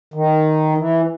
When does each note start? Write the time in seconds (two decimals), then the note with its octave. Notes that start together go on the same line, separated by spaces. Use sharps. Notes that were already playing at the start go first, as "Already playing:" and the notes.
0.14 D#3
0.78 E3